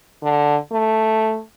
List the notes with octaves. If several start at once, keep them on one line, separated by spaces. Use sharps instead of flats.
D3
A3